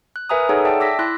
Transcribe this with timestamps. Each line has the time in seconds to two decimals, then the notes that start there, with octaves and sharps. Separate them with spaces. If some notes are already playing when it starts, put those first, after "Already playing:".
0.16 F#6
0.29 A#4 B4 E5 G#5 A#5 D#6
0.49 D#4 G#4 A4 C#5 F#5
0.65 D5 E5 G5 A5
0.80 D6 E6 A#6 B6
0.99 E4 C6 F#6 A#6